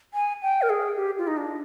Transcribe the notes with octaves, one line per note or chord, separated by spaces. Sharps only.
G#5
G5
A#4
G#4
G4
F4
D#4
D4